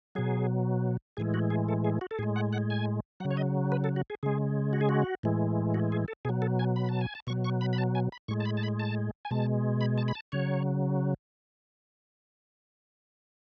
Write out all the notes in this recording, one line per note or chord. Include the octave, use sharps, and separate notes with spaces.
B2 F#3 G#4
A2 E3 G#3 G#4
F#4
G#4
A4
G#4
F#4
A4
A2 G#3 G#4
F#5
F#5
G#5
C#3 F#3 F#5
C#5
D#5
B4
A4
F#4
G#4
C#3 G#3 G#4
F#4
G#4
F#4
A2 E3 G#3
F#4
G#4
A4
B2 F#3 G#4
A4
G#5
B5
A5
G#5
A5
B2 F#3 C#6
C#6
B5
B5
A5
G#5
B5
A2 G#3 C#6
A5
B5
A5
B5
A5
G#5
B2 G#3 A5
B5
A5
B5
A5
C#3 F#3 C#5